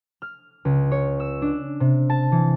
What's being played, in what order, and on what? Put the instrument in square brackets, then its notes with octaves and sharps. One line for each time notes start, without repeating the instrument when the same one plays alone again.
[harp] F6
C#2
C#5
E6
D4
C3
A5
E3